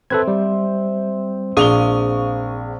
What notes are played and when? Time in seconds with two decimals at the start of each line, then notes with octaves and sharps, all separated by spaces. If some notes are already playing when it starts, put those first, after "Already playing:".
0.10 C4 A4 B4 E5 G#6
0.28 G3
1.57 A#1 G#4 F5 C#6 D#6 F7 G7